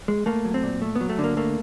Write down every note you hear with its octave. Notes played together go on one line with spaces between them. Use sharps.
G#3
A3 A#3
F#3
C4
A#2
A3
B3
F#3
A3
D3
A#3
A3 A#3